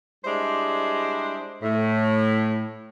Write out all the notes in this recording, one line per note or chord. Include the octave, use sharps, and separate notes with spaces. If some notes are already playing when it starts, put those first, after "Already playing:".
G3 G#3 D4 E4 C5
A2